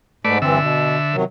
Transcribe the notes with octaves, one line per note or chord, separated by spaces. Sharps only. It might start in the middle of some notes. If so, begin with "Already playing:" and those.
G#2 A3 B4 D5
G2 D3 E3 C4 E5
B2
C3 D#3 F#3